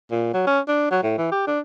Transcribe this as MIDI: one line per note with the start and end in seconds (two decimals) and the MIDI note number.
0.11 0.31 46
0.34 0.43 54
0.47 0.60 61
0.68 0.87 62
0.91 0.99 54
1.03 1.17 45
1.18 1.29 52
1.32 1.46 67
1.47 1.59 62